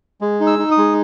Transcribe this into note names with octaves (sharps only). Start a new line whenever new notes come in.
G#3
D#4
E6
D#4
D#6
G#3